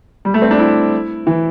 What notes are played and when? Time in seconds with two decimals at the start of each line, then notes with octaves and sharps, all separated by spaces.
0.25 G3
0.34 A3
0.42 C4
0.51 D4
0.59 E4
1.27 E3